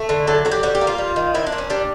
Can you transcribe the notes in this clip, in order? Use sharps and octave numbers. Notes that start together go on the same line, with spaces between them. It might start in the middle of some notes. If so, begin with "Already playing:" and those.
Already playing: A3
D3
F#3 A4
D3 F#4
G4
G3 F#4
G4
A#3
F4
G3
D#3
A#2 E4
D4
A#2
C#4
G3 D4